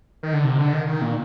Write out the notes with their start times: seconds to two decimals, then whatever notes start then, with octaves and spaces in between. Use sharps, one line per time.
0.23 D#3
0.33 D3
0.44 C3
0.59 D3
0.73 D#3
0.87 D#3
1.02 A#2